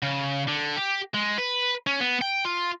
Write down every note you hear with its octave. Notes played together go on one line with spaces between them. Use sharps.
C#3
D3
G4
G#3
B4
C#4
B3
G5
F4